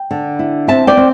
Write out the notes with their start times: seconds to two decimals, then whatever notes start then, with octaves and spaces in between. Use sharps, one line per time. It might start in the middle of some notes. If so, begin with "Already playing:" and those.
Already playing: G5
0.11 D3
0.39 E4
0.68 C4 E5 A5
0.87 D5 G5
0.97 C4